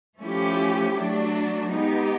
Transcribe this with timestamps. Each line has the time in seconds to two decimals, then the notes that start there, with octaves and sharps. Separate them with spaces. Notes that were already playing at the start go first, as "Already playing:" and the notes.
0.19 F3 A3 C#4 E4 G4
0.94 F#3 A3 D4
1.69 G#3 B3 D#4 G4